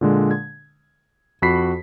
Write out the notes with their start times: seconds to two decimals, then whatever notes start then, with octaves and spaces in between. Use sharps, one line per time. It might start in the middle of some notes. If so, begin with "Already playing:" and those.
0.01 A#2 D3 G#3
0.31 G#6
1.42 F2 F#4 B5 B6 C7